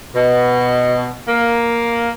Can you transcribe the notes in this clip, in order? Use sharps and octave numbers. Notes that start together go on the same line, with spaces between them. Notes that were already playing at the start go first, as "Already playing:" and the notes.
B2
A#3